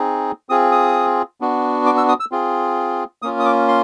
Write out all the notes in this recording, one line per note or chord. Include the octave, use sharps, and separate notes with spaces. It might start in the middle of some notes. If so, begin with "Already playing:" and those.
Already playing: C4 D#4 G#4
C4 F4 G#4 D#6
D#6
B3 D4 F#4
D6
E6
D#6
E6
C4 F4 G#4
A#3 C#4 F4 D#6
D#6
D6
C6